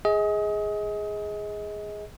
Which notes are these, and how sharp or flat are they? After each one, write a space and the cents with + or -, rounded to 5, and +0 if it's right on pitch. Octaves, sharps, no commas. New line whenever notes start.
G#4 +0 D#5 +30